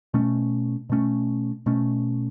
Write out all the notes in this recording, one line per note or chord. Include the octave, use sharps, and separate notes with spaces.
B2 A3 C#4
B2 A3 C#4
B2 A3 C#4